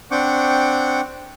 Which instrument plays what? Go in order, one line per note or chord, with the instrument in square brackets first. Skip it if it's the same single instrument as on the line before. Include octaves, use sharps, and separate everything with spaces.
[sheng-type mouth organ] C4 D4 F#5 G5 C#6 D6